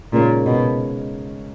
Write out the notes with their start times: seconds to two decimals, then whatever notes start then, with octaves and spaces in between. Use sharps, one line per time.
0.12 A#2 C#3 G#3 D#4 A#4 C#5
0.46 B2